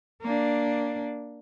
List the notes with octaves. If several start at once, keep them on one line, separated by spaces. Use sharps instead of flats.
A#3 D4